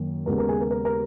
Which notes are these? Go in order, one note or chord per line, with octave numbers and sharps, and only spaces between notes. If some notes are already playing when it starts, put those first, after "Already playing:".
Already playing: F#2 D#3 A#3
D#2 C#3 G#3 B3 A#4
A#4
G#4
A#4
A#4
A#4